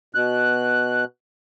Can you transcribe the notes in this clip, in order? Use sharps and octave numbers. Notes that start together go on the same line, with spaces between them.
B2 F#6